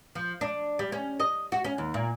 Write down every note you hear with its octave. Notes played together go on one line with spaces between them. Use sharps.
F3
D4
G3
C#4
D#5
F#4
C#4
D#2
A#2